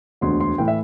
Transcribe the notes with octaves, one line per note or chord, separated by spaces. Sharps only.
E1 D2 D3 C6
C6
A2 E3 G5
E5